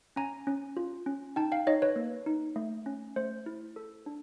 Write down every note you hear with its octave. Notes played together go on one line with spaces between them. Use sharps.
C#4 G#5 A#5
C#4
F4
C#4
D#4 G5 A5
F5 G5
D#4 C#5 D#5
B4 C#5
A#3
D#4
A3
C#4
A3 C5
E4
A4
D4